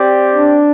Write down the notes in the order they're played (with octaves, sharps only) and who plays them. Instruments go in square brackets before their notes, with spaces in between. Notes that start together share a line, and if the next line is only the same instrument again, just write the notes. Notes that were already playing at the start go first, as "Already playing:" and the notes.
Already playing: [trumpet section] C4 G4 D5
[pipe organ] D4